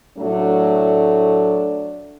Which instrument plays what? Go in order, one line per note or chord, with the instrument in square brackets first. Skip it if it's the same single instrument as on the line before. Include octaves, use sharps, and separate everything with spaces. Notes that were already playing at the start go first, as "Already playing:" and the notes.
[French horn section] A2 F#3 A3 D4